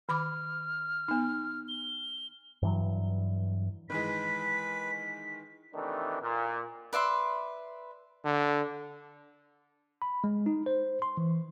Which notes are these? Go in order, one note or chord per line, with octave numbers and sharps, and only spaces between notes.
D#3 B5 D6 F6
B3 D#4
G7
G2 E3 F#3
D#3 E3 G#3 B4 B6
C3 D#3 E3 A3 D4
A#2
B4 D5 E5 C6
D3
B5
G#3
D#4
C5
C6
E3